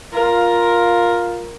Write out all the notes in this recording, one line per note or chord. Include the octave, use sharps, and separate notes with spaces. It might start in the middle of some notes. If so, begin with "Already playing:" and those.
F4 A#4